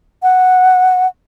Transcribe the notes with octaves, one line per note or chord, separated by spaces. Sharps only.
F#5